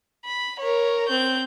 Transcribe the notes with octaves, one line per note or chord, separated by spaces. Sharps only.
B5
A#4 C#5
C4 G6